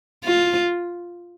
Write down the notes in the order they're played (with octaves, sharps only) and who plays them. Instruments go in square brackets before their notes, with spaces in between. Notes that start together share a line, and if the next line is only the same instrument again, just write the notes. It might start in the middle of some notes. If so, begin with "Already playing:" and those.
[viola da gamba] F4